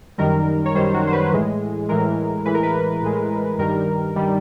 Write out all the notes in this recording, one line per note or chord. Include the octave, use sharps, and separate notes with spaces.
F#2 D#3 G3 A#4
C#5
F#2 D#3 G3 C5
F#4
C5
B4
A2 E3 G#3
A2 E3 G#3 A#4
A2 E3 G#3 B4
A#4
B4
A2 E3 G#3
G2 D#3 G3 A#4
D#3 G3